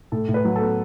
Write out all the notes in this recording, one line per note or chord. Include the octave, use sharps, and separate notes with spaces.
A2 A4
A2
B4
F#3
A4
B3